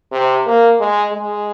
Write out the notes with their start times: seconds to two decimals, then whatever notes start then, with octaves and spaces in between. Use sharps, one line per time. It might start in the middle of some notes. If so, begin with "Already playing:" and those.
0.12 C3
0.46 A#3
0.80 G#3
1.13 G#3